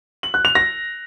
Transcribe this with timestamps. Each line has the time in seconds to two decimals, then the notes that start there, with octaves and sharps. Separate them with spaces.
0.23 F#7
0.34 F#6
0.45 F7
0.55 A#6